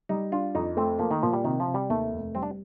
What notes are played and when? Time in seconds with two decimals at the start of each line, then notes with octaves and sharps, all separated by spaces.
0.09 G3 D#4
0.32 D4 F4
0.55 F2 D#4
0.77 A3 C4
0.99 F3 A#3
1.11 D#3
1.23 A#2 F3
1.33 G3
1.44 C3 D#3
1.60 F3
1.68 C3
1.74 G3
1.90 D#2 A3
2.12 F1
2.35 G3 C4
2.42 D4